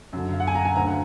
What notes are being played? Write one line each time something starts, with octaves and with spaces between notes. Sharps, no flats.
F#2 D3
F5
F#5
G#5
A#5
G#5
D2 D3 A#5
F#5